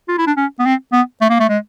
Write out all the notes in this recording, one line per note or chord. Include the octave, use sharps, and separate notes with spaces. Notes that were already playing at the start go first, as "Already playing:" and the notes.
F4
E4
D4
C#4
B3
C4
B3
A3
A#3
A3
G#3